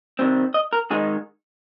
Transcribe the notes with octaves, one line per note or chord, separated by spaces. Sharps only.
C3 D#3 G3 C4
D#5
A#4
G#2 D#3 G#3 D#4 G#4